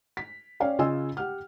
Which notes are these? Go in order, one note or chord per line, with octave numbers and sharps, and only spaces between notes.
B6
C#4 C#5 D5 F5 G5
C#3 F4 D#5 G#5 E6
G4 F#5 F6